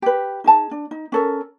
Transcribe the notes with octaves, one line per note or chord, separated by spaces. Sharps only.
G4 B4
D#4 G#4 A5
D4
D#4
C#4 A4 A#4